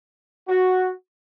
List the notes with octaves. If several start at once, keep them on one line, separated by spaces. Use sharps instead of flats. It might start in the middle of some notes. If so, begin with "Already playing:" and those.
F#4